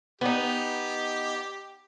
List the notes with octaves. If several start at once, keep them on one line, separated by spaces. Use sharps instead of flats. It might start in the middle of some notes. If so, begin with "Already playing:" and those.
B3 D#4 G4